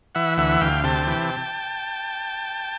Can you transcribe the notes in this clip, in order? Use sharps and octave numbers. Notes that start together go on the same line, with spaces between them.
E3 E5 F#5
D2 E5 F#5
D2 F5 G5
C3 G5 A5
E3